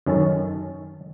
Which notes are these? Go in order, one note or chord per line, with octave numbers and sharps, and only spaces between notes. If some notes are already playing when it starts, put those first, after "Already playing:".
F#2 D#3 C#4 A4 A5